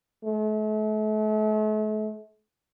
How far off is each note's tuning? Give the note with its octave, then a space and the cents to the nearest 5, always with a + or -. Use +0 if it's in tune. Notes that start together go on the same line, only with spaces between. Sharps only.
A3 -40